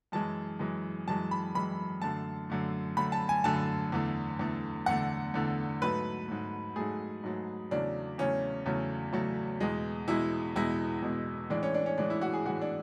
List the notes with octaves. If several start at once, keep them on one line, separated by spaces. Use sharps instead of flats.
F#2 E3 G#3 A5
F#2 E3 G#3
F#2 E3 G#3 A5
B5
F#2 E3 G#3 B5
F#2 D3 A3 A5
F#2 D3 A3
F#2 D3 A3 B5
A5
G#5
F#2 D3 A3 A5
E2 D3 A3
E2 D3 A3
E2 D3 A3 F#5
E2 D3 A3
G#2 F#3 A3 B4
G#2 F#3 A3
G#2 F#3 A3 G#4
G#2 F#3 A3
E2 C#3 F#3 A3 D4
E2 C#3 F#3 A3 C#4
E2 C#3 F#3 A3
E2 C#3 F#3 A3
E2 B2 G#3
E2 B2 G#3 E4
E2 B2 G#3 E4
E2 B2 G#3
A2 E3 G#3 D4
C#4
D4
C#4
A2 E3 G#3 D4
E4
F#4
G#4
A2 E3 G#3 F#4
D4